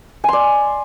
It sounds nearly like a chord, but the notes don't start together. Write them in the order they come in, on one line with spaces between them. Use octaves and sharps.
G#5 C6 D5